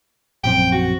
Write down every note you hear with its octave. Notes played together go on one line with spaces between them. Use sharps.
A#1 F#2 C4 G5
F#4